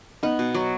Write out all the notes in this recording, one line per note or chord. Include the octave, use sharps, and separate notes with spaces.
B3 D#4
B2
F#3